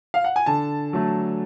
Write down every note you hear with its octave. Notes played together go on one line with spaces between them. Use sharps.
F5
F#5
G#5
D3 A5
F#3 A3